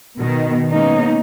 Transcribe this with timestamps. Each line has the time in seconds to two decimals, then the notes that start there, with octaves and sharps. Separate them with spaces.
0.17 B2 D#3
0.71 G#3 A#3 B3 C#4 D#4